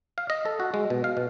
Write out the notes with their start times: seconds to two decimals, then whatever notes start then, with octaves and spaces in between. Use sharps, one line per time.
0.18 F5
0.30 D#5
0.45 A4
0.60 F#4
0.74 G#3
0.90 B2
1.04 F5
1.17 B2